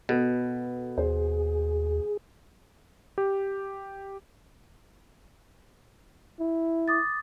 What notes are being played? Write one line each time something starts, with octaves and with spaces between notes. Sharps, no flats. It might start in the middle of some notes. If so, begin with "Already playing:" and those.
B2 B3 A4 B4
D#2 G#4 C5
G4
E4
D6 D#6 A6